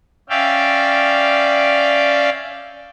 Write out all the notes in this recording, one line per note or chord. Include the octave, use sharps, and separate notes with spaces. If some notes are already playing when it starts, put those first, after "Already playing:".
C#4 D5 E5 F5 G5